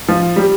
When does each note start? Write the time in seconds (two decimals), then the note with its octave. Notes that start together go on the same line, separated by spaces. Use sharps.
0.08 F3
0.36 G3